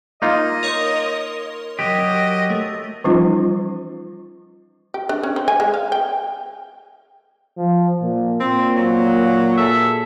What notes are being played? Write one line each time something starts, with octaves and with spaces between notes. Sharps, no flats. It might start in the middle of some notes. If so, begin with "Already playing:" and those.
A#3 D#4 F4 D#5
A#4 C#5 C6
F#3 G4 D#5
A3
E3 F3 G3 C#4 D#4 F4
G4
D4
C#4
C4
G#5
G#3
F5
G5
F3
A#2
A#2 C4
F#3
G#4 A4 E5